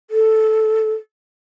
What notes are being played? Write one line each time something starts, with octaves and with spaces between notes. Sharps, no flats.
A4